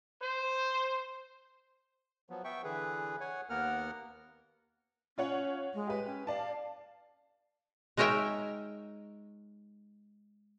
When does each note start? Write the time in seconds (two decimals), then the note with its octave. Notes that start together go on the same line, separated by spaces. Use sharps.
0.21 C5
2.30 F3 F#3 B3
2.44 B3 E5 G5 C#6
2.64 D3 E3 G#4 B4
3.20 C#5 F#5 G#5
3.50 D#2 A#3 B3 A#4 F#5 F6
5.18 C#4 F4 C#5 F#5
5.74 G#3
5.87 G4 B4
6.06 C#4
6.27 D5 F5 A5
7.97 G#3 D#4 A#4 C#5 E5 G5